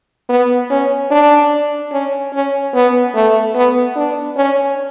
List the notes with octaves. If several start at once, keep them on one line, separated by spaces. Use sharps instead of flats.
B3
C#4
D4
C#4
C#4
B3
A3
B3
D4
C#4